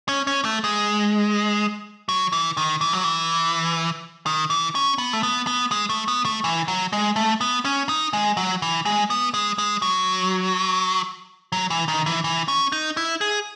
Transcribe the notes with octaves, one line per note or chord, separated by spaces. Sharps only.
C#4
C#4
A3
G#3
F#3
E3
D#3
E3
F#3
E3
D#3
E3
C#4
B3
A3
B3
B3
G#3
A3
B3
A3
E3
F#3
G#3
A3
B3
C#4
D#4
G#3
F#3
E3
G#3
B3
G#3
G#3
F#3
F#3
E3
D#3
E3
E3
C#4
D#4
E4
G#4